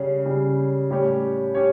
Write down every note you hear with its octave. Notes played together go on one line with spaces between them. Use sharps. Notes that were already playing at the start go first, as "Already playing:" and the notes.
Already playing: C#3 G3 C#4
C#3 G3 C#4
A2 G3 C#4 G4 C#5
C#4 G4 C#5